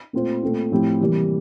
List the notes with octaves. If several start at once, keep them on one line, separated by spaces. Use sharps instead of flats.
A#2 A3 C4 F4 C5
A#2 A3 C4 F4
A2 F3 C4 E4 G4
C3 E3 G3 A#3